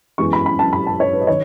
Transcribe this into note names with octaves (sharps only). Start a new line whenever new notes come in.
F#2 E3 G#3 B3 E4 C#6
B5
B5
A5
B5
A5
C#5
B4
D#5
D#3 C#5